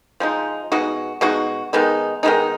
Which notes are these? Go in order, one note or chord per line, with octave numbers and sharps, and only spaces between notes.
F3 G#3 D#4
B2 G#3 D#4 F#4
B2 G#3 D#4 F#4
D#3 G#3 B3 D#4
D#3 G#3 B3 D#4